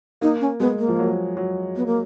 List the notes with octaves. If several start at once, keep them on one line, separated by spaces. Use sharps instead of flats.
A#3 D#4
C#4
G#3 B3
A#3
F3
F#3
F#3
B3
A#3